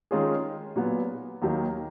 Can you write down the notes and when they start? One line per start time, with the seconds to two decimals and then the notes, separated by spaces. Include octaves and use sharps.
0.11 D#3 G#3 C#4 F4 G#4
0.76 A#2 F#3 B3
1.42 D#2 D#3 F#3 A#3